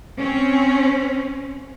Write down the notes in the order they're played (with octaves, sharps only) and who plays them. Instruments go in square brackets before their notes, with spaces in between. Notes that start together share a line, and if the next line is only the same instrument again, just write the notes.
[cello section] C4 C#4